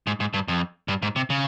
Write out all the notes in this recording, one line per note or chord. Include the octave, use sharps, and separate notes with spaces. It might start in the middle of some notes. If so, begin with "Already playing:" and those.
G#2
G#2
G2
F2
G2
G#2
C3
C#3